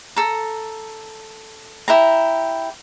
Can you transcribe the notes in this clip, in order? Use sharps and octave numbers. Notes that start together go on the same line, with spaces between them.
A4 A#5
E4 G4 A#5